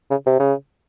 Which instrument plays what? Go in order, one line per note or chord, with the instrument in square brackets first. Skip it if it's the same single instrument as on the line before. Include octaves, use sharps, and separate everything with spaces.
[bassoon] C#3
C3
C#3